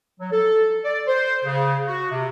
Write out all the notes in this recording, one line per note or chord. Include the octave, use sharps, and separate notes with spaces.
F#3
A4
D5
C5
C#3
F#4
C3